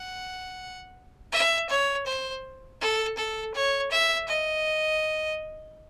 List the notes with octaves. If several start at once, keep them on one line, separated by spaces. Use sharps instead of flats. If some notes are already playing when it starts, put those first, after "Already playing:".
Already playing: F#5
E5
C#5
C5
A4
A4
C#5
E5
D#5